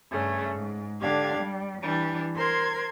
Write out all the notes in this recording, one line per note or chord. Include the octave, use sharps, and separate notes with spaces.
G2 C#3 A3
G#2
D3 D4 G4 F5 G#6
G3
E3 G3 D4
A#4 C5 C6 G#6